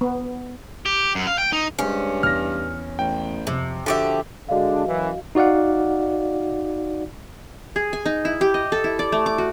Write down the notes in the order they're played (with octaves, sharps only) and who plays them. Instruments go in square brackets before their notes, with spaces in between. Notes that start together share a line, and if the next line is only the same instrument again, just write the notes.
[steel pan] B3
[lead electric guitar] G4
F#2
F5
G5
D#4
[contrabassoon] G2 [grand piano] G#3 C5 [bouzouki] C#4
[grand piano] E2 A#6 [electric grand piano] F6
[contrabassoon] A1 [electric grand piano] G5
[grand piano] F2 [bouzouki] C3
[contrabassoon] D3 [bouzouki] F3 G4 E5 [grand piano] F#4
[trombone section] D3 G#3 D4 [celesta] F#4 D#5 F5
[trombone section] F#2 E3
[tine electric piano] D#4 F#4 D5 F5 F#5
[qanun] G#4
G#5
D#4
E4
G4
D#5
A4
E4
D5
A3
D6
F#4